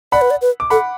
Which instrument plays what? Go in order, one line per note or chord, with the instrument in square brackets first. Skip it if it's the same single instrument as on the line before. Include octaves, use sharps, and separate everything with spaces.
[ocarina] D5 [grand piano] F#5 B5
[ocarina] B4
D5
B4
[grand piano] D6
[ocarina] A4 [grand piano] F#5 B5